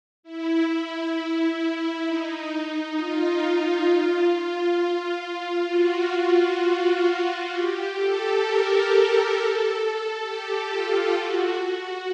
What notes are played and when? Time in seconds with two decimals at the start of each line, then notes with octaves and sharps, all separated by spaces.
0.23 E4
2.05 D#4
2.97 F4
5.68 F#4
6.14 F#4
6.58 F#4
7.04 F#4
7.49 G4
7.94 A4
8.41 A#4
8.86 A4
9.31 A4
9.77 A4
10.21 G4
10.67 F4
11.12 F#4